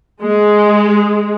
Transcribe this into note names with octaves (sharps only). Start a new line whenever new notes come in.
G#3